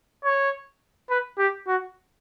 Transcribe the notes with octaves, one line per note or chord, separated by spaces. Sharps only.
C#5
B4
G4
F#4